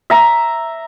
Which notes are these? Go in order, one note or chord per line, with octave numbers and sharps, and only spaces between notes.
E5 A#5